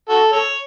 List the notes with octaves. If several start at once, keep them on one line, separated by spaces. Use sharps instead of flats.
F#4 A4
A4 C#5